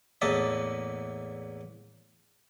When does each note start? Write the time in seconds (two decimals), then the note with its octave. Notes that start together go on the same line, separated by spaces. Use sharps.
0.21 A1 E2 A#3 D#5 E5 A5